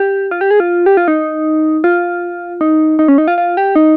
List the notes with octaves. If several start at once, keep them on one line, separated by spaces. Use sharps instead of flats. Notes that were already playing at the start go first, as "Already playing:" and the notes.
Already playing: G4
F4
G4
G#4
F4
G4
F4
D#4
F4
D#4
D#4
C#4
D#4
F4
F4
G4
D#4